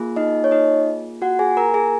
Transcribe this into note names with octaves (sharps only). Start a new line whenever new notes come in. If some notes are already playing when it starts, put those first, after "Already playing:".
Already playing: A#3 F4 G#4
D#4 D#5
C#5
D#4 D#5
F#4 F#5
G#4 G#5
A#4 A#5
G#4 G#5